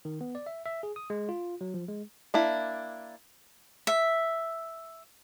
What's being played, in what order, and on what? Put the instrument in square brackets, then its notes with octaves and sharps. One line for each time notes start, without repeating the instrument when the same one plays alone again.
[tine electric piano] D#3
B3
D5
E5
E5
G#4
D#6
G#3
F4
F#3
F3
G#3
[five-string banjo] A#3 D4 E4
[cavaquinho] E5